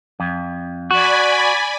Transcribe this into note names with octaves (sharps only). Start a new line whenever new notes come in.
F2
F#4 D5 G#5 B5